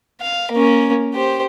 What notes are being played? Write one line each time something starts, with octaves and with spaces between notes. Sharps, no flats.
F5
A#3 C#4
G4 C5